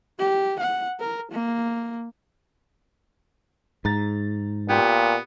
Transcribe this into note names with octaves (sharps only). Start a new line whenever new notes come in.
G4
F#5
A#4
A#3
G#2 A#5 A6
A#2 B3 F4 G4